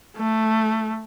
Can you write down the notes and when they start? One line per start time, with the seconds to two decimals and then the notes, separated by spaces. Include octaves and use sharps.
0.17 A3